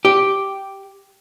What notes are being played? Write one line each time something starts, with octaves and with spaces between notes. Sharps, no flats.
G4